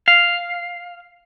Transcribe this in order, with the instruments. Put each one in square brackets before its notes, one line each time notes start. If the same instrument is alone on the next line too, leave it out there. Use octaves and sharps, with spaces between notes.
[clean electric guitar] F5